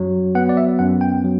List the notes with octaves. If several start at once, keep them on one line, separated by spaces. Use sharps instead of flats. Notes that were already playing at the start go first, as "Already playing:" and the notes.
Already playing: F#2 F#3
B3 F#5
D5
E5
F#2 F#5
G5
F#3